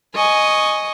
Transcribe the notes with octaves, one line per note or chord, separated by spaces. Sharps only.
D#5 G#5 C#6